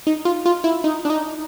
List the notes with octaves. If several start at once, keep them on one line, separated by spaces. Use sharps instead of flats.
D#4
F4
F4
E4
D#4
D4
D#4